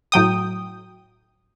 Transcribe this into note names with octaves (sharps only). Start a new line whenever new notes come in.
A2 F#3 G5 D#6